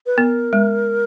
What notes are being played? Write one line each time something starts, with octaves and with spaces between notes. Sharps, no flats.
B4
B3 A#4
G#3